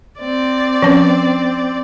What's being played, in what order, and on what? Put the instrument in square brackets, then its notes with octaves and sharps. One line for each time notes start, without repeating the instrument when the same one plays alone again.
[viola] C4 D5
[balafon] F3 C#4 B4